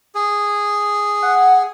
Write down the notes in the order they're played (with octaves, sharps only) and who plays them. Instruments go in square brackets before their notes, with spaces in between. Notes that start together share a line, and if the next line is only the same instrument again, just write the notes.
[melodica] G#4
[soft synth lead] F#5